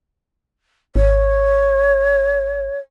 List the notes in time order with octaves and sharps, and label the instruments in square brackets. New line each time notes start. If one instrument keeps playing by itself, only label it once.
[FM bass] G#1 [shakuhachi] C#5